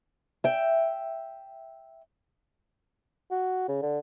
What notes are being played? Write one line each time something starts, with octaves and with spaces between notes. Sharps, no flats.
E5 G5
F#4
C#3
D3